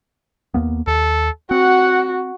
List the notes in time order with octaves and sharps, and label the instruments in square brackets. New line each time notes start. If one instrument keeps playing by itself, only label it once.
[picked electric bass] D#2 A#3 B3
[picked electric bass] D#2 [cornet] A4
[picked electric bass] C4 [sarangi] F#4 [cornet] F#5